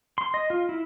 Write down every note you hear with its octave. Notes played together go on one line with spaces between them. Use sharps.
C6
D#5
F4
E4